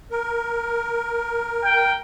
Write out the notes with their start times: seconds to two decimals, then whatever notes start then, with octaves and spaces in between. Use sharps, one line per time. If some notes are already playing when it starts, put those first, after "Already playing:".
0.10 A#4
1.64 G5